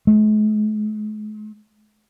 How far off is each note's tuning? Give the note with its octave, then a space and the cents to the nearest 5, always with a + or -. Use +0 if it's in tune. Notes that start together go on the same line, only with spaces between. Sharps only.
G#3 +45